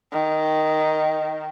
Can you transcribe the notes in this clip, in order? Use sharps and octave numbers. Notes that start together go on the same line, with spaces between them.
D#3